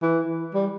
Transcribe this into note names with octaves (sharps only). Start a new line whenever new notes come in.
E3
G3